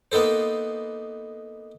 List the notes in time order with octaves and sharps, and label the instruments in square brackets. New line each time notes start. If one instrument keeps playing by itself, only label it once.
[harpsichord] A#3 B3 D#4 A4 C5